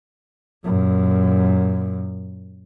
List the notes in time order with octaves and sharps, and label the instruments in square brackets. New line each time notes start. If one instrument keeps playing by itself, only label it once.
[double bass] F#2 A#2